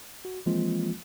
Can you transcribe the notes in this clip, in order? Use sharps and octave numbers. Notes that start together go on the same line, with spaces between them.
F#4
E3 F3 G#3 A#3 C4 F4